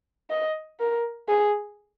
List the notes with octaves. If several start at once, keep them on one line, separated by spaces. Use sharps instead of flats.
D#5
A#4
G#4